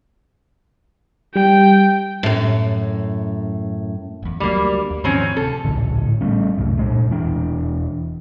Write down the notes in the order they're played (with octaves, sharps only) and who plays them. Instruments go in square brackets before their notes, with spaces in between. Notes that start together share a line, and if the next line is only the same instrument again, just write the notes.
[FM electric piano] G3 [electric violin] G5
[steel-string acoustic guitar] F#2 A2
[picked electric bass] F#1 E2
[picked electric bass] D2 F#3 [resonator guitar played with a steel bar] G3 A#3
[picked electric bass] D#2
[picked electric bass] G#2 D#3 F3 [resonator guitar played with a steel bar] F#3 C4 C#4
[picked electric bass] D1 B1 C3 [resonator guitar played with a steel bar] A4
[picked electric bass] D1 A#1 D3
A2
G3 A3 C#4
C2 F#2 A2
A#2 G#3 A3
E1 E3 D4